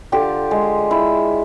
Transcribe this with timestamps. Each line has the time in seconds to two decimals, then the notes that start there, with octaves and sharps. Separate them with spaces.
0.12 D3 F4 G4
0.51 G#3
0.91 E4